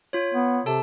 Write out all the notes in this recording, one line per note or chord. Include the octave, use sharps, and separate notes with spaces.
F4 C#5
B3
C3 A4 A5